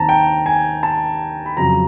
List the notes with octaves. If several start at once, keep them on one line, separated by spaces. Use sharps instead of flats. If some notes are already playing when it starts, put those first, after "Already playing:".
Already playing: D#2 D#3 C4 A5 A#5
G5
G#5
A5
B5
F2 C#3 F#3 A#5